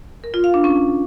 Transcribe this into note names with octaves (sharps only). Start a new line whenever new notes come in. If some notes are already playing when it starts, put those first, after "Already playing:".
A#4
F4
F5
D4
C#4